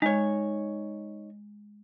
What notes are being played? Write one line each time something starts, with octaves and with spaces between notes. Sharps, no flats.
G#3 D#4 C#5